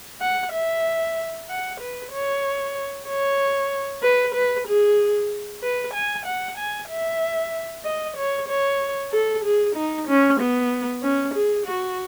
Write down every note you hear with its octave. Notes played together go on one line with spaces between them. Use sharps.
F#5
E5
F#5
B4
C#5
C#5
B4
B4
G#4
B4
G#5
F#5
G#5
E5
D#5
C#5
C#5
A4
G#4
D#4
C#4
B3
C#4
G#4
F#4